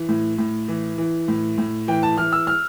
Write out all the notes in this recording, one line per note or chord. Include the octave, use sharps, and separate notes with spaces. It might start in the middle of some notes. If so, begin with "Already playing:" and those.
Already playing: E3
A2
A2
E3
E3
A2
A2
E3 G5
A5
E3 F6
E6
F6